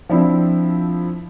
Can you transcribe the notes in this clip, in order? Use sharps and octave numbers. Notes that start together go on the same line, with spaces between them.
F3 C4 D4 E4